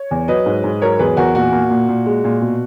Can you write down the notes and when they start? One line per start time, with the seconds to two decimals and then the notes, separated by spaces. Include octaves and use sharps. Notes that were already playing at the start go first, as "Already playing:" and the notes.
Already playing: C#5
0.11 E2
0.28 F#3 B4 D#5
0.46 G#2
0.64 G#2
0.82 F#3 A#4 C#5
0.99 E2 G#4 B4
1.17 E2 F#4 A#4
1.35 A#2 F#4
1.52 A#3
1.70 A#2
1.89 A#2
2.06 G#3
2.24 A#2
2.42 B2